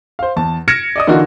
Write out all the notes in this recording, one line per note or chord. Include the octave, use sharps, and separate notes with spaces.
C5 F5
E2 A5
F6 G#6 A#6 C#7 D7 E7
D5 D#5 D#6
D3 E3 D#4 F4 F#4 A#4